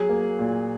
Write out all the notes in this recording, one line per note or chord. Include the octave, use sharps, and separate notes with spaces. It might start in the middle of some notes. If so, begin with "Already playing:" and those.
Already playing: F#3 G#4
A#3
A#2